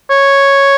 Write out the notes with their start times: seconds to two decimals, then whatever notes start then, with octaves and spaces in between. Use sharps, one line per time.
0.10 C#5